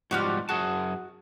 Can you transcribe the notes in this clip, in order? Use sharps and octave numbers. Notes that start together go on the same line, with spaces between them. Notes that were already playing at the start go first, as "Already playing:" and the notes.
G#2 F3 G3 F#4 G4 F6
F#2 F#4 G#4 A5